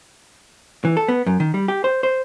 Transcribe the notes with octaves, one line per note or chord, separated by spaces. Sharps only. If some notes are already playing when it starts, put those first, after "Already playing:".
E3
A4
B3
F#2
D#3
G3
G4
C5
C5